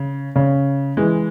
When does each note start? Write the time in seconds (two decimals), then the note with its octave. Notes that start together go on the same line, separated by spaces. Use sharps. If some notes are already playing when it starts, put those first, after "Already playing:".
Already playing: C#3
0.36 C#3
0.97 E3 G#3